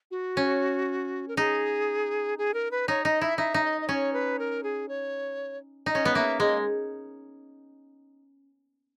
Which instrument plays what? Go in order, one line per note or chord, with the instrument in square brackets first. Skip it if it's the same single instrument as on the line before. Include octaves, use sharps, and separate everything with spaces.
[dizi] F#4
[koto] C#4
[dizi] A#4
[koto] D#4 [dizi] G#4
[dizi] G#4
A#4
B4
[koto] D#4 [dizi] C#5
[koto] D#4 [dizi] D#5
[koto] E4 [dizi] E5
[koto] D#4 [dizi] E5
[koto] D#4
[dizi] D#5
D#5
[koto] C#4 [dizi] C#5
[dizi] B4
A#4
G#4
C#5
[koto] D#4 [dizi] D#5
[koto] C#4
B3
[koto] A#3 [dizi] E5
[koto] G#3 [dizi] D#5